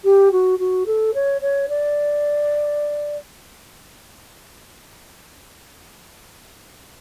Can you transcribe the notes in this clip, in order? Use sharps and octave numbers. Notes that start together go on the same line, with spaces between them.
G4
F#4
F#4
A4
C#5
C#5
D5